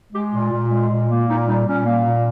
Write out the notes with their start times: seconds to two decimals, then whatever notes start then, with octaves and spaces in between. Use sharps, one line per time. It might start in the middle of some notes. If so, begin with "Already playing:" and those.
0.13 G#3 G4
0.32 A#2 F4
0.52 A#2
0.71 G#3
0.90 A#2
1.09 A#3
1.28 A#2 D#4
1.47 G3 D#4
1.66 A#2 C#4
1.86 A#3
2.05 A#2